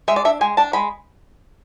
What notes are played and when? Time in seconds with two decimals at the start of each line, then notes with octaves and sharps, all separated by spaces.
0.08 G#3 E5
0.16 D5
0.25 D4 E5
0.41 G#3 G#5
0.57 D4 A5
0.73 G#3 B5